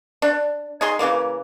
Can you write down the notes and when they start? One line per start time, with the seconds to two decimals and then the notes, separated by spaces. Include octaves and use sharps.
0.22 D4
0.81 D#4 G#4 C6
0.99 C#3 E3 F#3 A#3